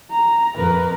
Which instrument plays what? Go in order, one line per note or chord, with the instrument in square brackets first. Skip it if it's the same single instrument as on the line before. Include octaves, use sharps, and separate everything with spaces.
[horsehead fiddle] A#5
[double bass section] F2 [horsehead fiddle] A#4 B4